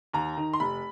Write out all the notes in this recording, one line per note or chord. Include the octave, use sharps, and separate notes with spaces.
D#2 A#5
D#3
C6
F1 B5